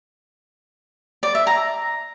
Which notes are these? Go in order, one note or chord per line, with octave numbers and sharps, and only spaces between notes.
D5
E5
A#5